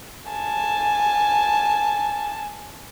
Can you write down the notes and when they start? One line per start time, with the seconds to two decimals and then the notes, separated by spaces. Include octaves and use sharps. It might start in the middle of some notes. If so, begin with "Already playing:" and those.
0.30 G#5 A5